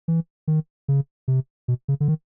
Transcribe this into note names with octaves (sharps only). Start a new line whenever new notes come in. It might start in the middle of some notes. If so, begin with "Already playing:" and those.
E3
D#3
C#3
C3
B2
C#3
D3
D#3